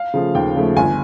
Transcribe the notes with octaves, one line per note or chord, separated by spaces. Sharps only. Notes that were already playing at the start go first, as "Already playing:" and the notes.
Already playing: F5
C#3 F3 A3
D#2 G5
C#3 F3 A3
G1 G#5